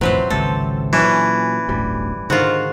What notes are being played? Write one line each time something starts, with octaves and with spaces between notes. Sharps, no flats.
E1 A1 F2 E3 F#3 C4 B4 C5
G#1 C#2 C3 C4 A4
A#2 E3 F#3 C#4 D4
D1 G1 D2 G3
G#2 D3 D#3 F4 F#4 F5